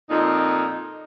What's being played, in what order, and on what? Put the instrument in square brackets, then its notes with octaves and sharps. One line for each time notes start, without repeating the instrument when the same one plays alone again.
[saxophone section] F2 A#2 D#4